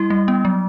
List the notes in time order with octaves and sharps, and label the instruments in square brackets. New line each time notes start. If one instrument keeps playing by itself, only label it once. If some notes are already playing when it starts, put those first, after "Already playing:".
Already playing: [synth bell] G3 E4
G3
B3
F#3